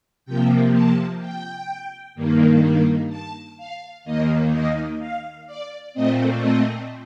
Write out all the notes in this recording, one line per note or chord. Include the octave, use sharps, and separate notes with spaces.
C3 F3 A#3 G5
A5
G5
G2 D#3 A#3
A5
F5
D#2 D#3 A#3 D#5
D#5
F5
D5
A#2 A3 C4 D#5
D#5